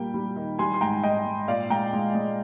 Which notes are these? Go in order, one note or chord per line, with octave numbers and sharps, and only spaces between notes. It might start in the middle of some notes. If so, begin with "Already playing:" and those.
Already playing: A#2 G3 A#3 G5
G3
D#3
G3 G#5 C6
C6
G#2 G5 A#5
G#2 D#5 G5
G#2
A#2 D5 F5
G#3 G5 A#5
G#3
G#3